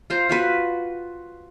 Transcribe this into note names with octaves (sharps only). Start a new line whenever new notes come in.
F4 C5 F5 A#5
F4 F#4 B4